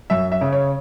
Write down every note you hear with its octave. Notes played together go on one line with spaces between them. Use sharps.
F#2 E5
E5
C#3
C#5